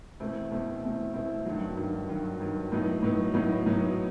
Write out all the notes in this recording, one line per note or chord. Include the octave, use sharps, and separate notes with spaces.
E2 B2 A3 C4 E4
E2 B2 A3 C4 E4
E2 B2 A3 C4 E4
E2 B2 A3 C4 E4
G2 D#3 F#3
G2 D#3 F#3
G2 D#3 F#3
G2 D#3 F#3
A2 F#3 B3 D#4
A2 F#3 B3 D#4
A2 F#3 B3 D#4
A2 F#3 B3 D#4